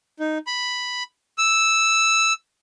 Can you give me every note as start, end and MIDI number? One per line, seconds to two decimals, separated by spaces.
0.20 0.38 63
0.47 1.03 83
1.38 2.33 88